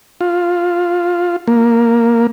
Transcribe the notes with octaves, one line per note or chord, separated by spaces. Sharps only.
F4
A#3